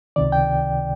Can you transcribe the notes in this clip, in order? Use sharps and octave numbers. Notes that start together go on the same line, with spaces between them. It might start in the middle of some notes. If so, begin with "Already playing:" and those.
C#2 C3 D#3 D5
G5